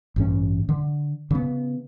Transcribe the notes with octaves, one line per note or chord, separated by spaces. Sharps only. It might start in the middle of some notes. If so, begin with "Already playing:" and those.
A1 G2 C#4
D3
C#3 B3